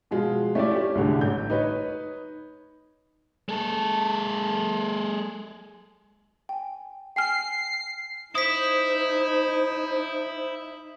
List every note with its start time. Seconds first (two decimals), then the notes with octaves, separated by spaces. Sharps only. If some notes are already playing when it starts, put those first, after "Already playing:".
0.11 B2 F3 G#3 F4
0.55 A3 C#4 E4 F4 G4 D5
0.71 C#4 G4
0.95 C2 A2 D3 G#3
1.21 A1 G6
1.50 D#4 B4 C#5
3.49 G#3 A4
6.49 G5 G#5
7.16 G5 G#5 F6 C7
8.35 D#4 E4 C5 D#6 B6